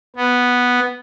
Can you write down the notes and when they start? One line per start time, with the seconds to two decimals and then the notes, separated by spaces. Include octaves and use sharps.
0.16 B3